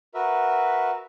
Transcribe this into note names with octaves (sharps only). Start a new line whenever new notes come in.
F#4 A#4 B4 E5